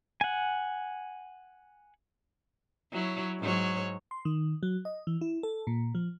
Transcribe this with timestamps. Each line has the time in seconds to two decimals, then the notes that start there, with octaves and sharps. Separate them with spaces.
0.21 F#5 G#5
2.92 F#3 E4 C#5
3.40 G#2 F#3 C#5
4.11 C6
4.25 D#3
4.63 F#3
4.85 D#5
5.07 E3
5.21 E4
5.43 A4
5.67 A#2
5.95 F3